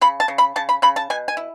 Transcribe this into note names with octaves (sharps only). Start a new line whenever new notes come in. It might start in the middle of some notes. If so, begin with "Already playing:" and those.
C#3 B5
A5
C#3
B5
C#3 A5
B5
C#3 B5
A5
B2 G#5
G#5
E4